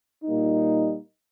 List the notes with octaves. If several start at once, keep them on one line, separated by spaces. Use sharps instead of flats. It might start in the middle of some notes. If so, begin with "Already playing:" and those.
A#2 G3 A#3 D#4